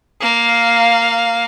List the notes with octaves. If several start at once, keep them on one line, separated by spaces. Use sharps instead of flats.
A#3 F5